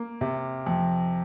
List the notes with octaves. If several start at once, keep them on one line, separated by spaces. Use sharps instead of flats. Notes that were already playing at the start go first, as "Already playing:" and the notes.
Already playing: A#3
C3
F2